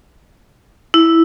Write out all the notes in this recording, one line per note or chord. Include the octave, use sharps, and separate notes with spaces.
E4